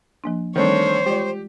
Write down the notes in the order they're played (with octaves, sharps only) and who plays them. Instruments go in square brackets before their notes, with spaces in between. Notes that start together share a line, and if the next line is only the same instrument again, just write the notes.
[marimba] F3 A#3 D4
[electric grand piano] D#3 A3 D4 [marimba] E3 G3 C4 [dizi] C5 [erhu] C#5
[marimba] G#3 F4 D5 [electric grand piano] G4